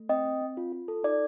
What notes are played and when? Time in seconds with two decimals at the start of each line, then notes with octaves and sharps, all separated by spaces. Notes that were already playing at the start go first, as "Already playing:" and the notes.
Already playing: A3
0.09 C4 D#5 G5
0.25 C4
0.41 C4
0.57 F4
0.72 F4
0.88 A4
1.03 D#4 D5